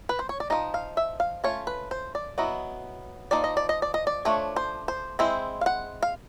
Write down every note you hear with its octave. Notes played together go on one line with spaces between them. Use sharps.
B4
C5
C#5
D5
F3 A#3 D#4 D#5
F5
E5
F5
A3 C#4 F4 C#5
B4
C5
D5
F#3 B3 E4 D#5
F3 A#3 D#4 D5
D#5
D5
D#5
D5
D#5
D5
F3 A3 D4 C#5
C5
C5
G#3 C4 E4 C5
F5
F#5
F5